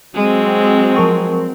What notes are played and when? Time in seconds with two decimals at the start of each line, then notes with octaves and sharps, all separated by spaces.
0.15 F#3 G#3 C4
0.96 F3 A#4 C#6